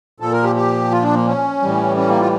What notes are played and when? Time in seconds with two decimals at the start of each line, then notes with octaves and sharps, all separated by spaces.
0.20 A#2 F3 A4
0.32 A#4
0.44 G4
0.55 G4
0.91 F4
1.02 D4
1.14 A#3
1.27 C#4
1.62 A2 E3 G3
1.97 C#4
2.09 A#3
2.20 F4